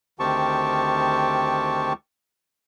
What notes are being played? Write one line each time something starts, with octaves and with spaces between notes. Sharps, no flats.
D2 D#3 C4 G4 A5 C#6